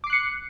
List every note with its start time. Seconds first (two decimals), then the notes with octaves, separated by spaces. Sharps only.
0.04 D6
0.07 C7
0.10 F#6
0.13 C#7